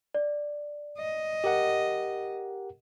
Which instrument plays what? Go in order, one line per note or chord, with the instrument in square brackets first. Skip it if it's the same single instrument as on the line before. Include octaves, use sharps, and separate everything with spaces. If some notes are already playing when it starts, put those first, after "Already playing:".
[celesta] D5
[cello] D#5
[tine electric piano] G4 A#4 F#5